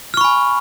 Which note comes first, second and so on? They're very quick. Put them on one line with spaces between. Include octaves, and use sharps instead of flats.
F6 C#6 B5 G#5